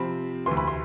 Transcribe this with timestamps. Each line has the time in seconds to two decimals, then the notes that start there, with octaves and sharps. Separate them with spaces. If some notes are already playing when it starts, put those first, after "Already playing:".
Already playing: C3 F3 C4 B5
0.46 D2 C3 E3 C6
0.57 B5
0.68 C6